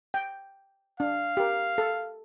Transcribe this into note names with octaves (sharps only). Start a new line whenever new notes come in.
G5
D4 F5
G4 A#4
A4